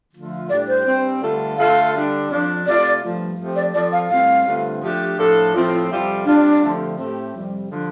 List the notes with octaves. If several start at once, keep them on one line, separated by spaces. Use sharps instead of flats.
D3 F3 A3 F4
A2 G3 D4 G4 D5
C5
G2 G3 C4
G2 D3 A3 F4 A4
D3 A3 F4 A4 F5
D3 G3 D4
F2 F3 D4
C3 A3 F4 D5
G2 F3 A3
F3 A3 C4 G4
D5
F3 C4 F4 A4 D5
F5
A2 G3 C4 F5
G2 D3 A3 C4 F4
F3 A3 D4 G4
A2 F3 D4 A4
A2 F3 A3 C4 F4
F2 C3 G3 F4 A4
C3 G3 D4 F4
D3 F3 A3 C4 G4
A2 A3 C4 G4
F2 C3 G3
D3 F3 D4